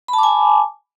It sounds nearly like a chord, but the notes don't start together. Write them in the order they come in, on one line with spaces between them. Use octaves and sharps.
B5 A5 D6 G#5